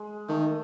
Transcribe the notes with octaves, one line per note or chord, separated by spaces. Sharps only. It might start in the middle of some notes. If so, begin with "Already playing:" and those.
Already playing: G#3
D#3 A3